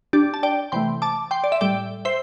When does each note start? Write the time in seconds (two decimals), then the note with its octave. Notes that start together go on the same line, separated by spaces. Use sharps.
0.13 D4 G4
0.34 A5
0.43 D5 G5
0.72 C3 E3 A3 G5 C6
1.02 A5 D6
1.31 G5 C6
1.44 D5
1.52 E5
1.61 A2 G3 D5 G5
2.05 C5 E5